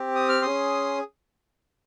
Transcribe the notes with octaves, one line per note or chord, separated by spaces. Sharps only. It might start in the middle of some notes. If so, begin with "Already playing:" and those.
Already playing: C4 G4
D#6
F6
C#4 G#4 C6 D#6